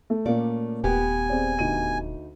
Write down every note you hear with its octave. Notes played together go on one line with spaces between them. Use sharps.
A3
A#2 A3 A#3 C#4 D5
D#1 B3 G4 B4 G#5
C4 G#4 D5
D2 D#4 D#7